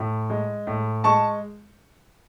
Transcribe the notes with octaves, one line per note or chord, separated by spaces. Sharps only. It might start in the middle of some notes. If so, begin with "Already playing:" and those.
Already playing: A2
G#3
A2
G#3 A5 C#6